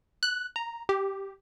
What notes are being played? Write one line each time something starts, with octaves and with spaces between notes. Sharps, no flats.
F#6
A#5
G4